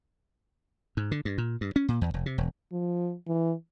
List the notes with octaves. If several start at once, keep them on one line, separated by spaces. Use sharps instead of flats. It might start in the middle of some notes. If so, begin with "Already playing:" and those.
G#2
D3
G2
A#2
G2
C#4
A#2
E2
F1
C3
E1
F3
E3